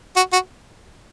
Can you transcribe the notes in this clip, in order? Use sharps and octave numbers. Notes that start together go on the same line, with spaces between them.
F#4
F#4